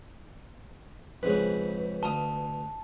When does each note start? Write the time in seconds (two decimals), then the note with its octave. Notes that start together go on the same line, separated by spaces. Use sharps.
1.23 F2 G#2 C#3 B4
2.03 D2 F5 A5 D#6